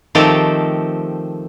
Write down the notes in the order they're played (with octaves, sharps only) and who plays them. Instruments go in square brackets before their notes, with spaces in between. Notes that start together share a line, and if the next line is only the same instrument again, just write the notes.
[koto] D#3 F3 A3 C4 G4 A4